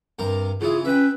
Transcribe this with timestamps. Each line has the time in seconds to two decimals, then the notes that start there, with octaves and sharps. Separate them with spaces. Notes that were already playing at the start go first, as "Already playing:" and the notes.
0.19 G2 C3 A#4
0.61 C#3 E3 E4 F4 G#4
0.85 C#4 B4 E5 G5